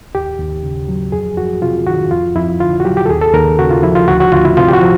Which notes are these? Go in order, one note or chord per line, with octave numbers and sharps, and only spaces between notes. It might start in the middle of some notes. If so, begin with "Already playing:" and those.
D#2 G4
D#2
C#3
F#3
F2 G#4
F2 F#4
C3 F4
D#3 F#4
F2 F4
F2 E4
D3 F4
F#4
F#3 G4
G4
A4
D#2 G#4
A4
D#2 A#4
C#3 F#4
F4
F3 E4
F4
D2 F#4
F#4
D2 F4
E4
C3 F4
G4
F#4
F3